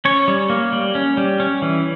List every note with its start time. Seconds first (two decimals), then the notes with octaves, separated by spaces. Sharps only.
0.05 C#4 C#5
0.28 G3
0.50 A#3
0.72 G3
0.95 C#4
1.17 G3
1.40 C#4
1.62 E3